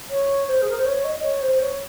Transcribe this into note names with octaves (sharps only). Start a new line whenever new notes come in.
C#5
C5
G#4
A#4
C5
C#5
D#5
C#5
C5
C#5